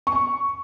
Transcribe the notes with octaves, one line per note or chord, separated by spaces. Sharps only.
C#6